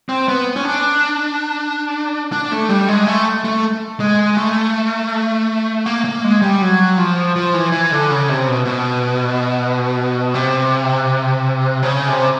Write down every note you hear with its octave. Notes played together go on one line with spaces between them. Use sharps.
C4
B3
C#4
D4
D4
A3
G3
G#3
A3
A3
G#3
A3
A#3
A#3
G#3
G3
F#3
F3
F3
E3
E3
D3
C#3
C3
B2
B2
C3
C#3
C3